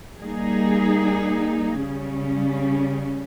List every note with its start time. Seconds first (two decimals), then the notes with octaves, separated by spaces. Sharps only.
0.21 G3 A#3 D#4 G#4
1.81 C#3 G3 C#4